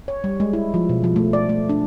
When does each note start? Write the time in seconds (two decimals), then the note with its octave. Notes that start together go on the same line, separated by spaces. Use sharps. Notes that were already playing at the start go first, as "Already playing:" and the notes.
0.08 C#5
0.24 G3
0.40 G#3
0.53 E4
0.74 F3
0.89 B2
1.04 F3
1.16 A3
1.33 D5
1.49 A3
1.69 D4